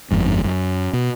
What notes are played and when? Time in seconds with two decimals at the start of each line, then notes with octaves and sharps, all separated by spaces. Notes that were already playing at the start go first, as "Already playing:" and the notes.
0.11 G1 F2 G#2
0.45 F#2
0.93 B2